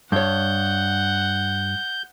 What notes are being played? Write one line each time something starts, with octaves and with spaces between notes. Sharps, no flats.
G2 C#5 F#5 G6